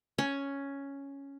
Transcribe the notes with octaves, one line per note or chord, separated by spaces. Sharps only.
C#4